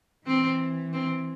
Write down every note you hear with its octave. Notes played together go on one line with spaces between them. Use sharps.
E3 C4
C4